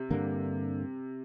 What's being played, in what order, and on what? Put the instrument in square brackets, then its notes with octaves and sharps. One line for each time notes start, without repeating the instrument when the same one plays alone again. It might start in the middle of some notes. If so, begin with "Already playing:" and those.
Already playing: [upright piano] C3
[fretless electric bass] G2 D3 A#3